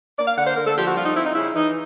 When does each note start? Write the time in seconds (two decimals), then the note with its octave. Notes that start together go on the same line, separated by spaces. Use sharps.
0.17 A#3 D5
0.26 F5
0.36 D3 F#5
0.46 C5
0.56 D3 A#4
0.66 A4
0.75 F3 G4
0.86 F#4
0.95 G3 F4
1.05 D#4
1.15 C4 E4
1.25 D#4
1.34 C#3 E4
1.54 E3 D#4